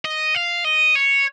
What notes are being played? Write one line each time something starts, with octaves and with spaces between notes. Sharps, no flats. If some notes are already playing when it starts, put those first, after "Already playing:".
D#5
F5
D#5
C#5